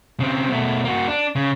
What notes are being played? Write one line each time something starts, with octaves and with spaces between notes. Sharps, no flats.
C#3 C4
B2 A3
A#3 F#4
D4
C#3